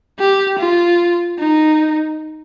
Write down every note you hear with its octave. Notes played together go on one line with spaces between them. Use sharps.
G4
F4
D#4